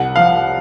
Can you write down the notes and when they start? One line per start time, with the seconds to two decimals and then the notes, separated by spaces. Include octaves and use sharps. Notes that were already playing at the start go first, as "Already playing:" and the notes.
Already playing: C2 F#5
0.16 F3 F5